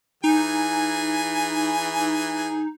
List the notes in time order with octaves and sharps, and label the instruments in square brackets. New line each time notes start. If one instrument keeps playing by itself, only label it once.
[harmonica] E3 G#4 G#5 [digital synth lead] D#4